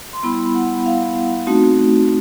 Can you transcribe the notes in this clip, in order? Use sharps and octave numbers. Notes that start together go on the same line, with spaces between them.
C6
G3 B3 E4 B5
F#5
F5
A3 C4 D#4 F#4